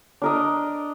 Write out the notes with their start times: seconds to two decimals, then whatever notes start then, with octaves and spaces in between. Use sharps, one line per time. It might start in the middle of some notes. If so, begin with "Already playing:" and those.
0.22 D4 A#4 D#5